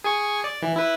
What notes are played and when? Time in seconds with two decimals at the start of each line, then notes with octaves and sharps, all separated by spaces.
0.04 G#4 G#5 C#6
0.44 D5
0.62 E3
0.76 E4 B4